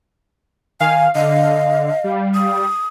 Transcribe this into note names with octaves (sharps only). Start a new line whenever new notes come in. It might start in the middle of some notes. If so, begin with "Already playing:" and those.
D#3 F5 G#5
D3 D#5
G3
D#6